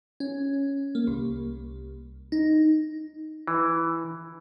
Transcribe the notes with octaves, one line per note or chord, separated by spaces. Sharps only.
C#4
A#3
C2
D#4
E3